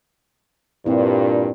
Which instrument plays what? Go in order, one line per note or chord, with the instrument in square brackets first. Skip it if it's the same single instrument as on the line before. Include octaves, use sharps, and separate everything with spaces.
[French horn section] G2 A#2 [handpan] C4 E4